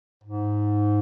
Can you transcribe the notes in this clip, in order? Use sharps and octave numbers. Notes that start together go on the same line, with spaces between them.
G#2